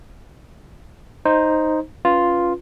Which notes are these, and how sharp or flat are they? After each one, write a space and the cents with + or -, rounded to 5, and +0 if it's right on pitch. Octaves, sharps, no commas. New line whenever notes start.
D#4 +0 C5 +5
C#4 +10 F4 +0 B4 +0